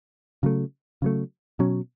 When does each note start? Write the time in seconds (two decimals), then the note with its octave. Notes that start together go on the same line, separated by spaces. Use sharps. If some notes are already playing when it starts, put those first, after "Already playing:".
0.43 C#3 F#3 A3
1.02 C#3 F#3 A3
1.59 B2 F#3 C#4